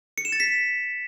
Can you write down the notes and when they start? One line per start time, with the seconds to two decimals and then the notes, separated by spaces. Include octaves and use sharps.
0.18 C#7
0.25 E7
0.32 A6
0.40 B6